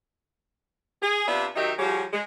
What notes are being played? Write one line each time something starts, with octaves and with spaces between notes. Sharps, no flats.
G#4
C3 B3 D4 F4 D5 E5
D#3 F#3 D#4 G4 E5
F3 G3 C#4 F#4 G#4 C#5
G#3